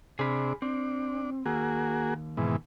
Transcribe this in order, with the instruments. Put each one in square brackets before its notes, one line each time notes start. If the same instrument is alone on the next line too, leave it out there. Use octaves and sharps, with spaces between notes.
[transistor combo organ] C3 D4 [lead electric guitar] G#4 B5
[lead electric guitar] C4 [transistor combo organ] D4
[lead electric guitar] D#2 [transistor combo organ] A#3 F#4 G#4
[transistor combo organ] G#2 B2 E3